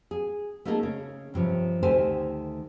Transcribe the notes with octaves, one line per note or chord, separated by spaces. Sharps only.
G#4
A3 A#3 D#4 F4 G#4 A4
C#3
G2 C3 F3 C#4
D2 D#3 A3 G4 C5 G#5